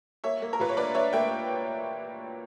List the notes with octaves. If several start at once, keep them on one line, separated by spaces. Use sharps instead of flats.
A#3 C#5 E5
A#3
A#4
A#2 B4
C#5
D4 B4 D5
D4 C#5 E5
A#3 E5 G5